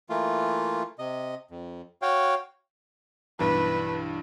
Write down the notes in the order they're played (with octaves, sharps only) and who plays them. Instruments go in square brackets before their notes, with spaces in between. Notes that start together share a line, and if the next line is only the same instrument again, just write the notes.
[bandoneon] E3 A3 A#3 F4
C3 D#5
F2
F#4 C#5 F5 G5
[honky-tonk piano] B1 G2 E3 [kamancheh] B4